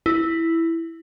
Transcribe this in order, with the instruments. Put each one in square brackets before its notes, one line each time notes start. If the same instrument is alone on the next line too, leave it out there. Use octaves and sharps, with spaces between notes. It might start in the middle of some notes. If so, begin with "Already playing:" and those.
[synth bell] E4